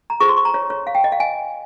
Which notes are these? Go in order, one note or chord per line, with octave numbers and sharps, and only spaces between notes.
A#5
F4 G#4 C5 C#6
C6
C#6
A#5
C#5
C#5
F5
G5
D#5
F5
G#5